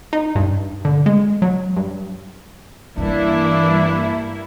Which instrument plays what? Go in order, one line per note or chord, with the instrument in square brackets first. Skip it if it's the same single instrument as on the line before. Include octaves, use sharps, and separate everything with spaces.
[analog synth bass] D#4
G2
D3
G#3
F#3
G2
[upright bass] G2 [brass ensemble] E3 D4 [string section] G3 A#3 E4